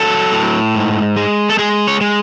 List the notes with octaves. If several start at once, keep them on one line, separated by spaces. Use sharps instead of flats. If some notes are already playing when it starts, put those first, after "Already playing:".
Already playing: F#3 A4
A2
G#2
G#3
A4
G#3 G#4
C#5
G#3